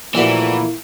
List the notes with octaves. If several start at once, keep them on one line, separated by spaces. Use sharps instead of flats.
A#1 E3 F3 A3 A#3 E4 F#4 D5